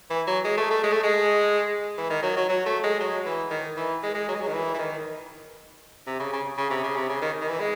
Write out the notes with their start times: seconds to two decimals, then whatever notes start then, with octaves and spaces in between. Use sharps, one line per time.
0.10 E3
0.27 F#3
0.44 G#3
0.57 A3
0.71 A3
0.83 G#3
0.93 A3
1.03 G#3
1.98 E3
2.10 D#3
2.23 F#3
2.37 F#3
2.49 F#3
2.66 A3
2.84 G#3
3.00 F#3
3.26 E3
3.51 D#3
3.77 E3
4.03 G#3
4.15 G#3
4.29 F#3
4.35 G#3
4.41 F#3
4.47 D#3
4.53 E3
4.74 E3
4.79 D#3
6.07 C3
6.20 C#3
6.33 C#3
6.58 C#3
6.70 C3
6.84 C#3
6.96 C3
7.09 C#3
7.22 D#3
7.41 D#3
7.48 E3
7.60 G#3